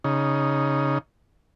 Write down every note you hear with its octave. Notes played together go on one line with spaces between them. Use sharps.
C#3 D#4